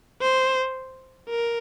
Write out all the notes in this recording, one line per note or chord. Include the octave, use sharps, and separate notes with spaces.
C5
A#4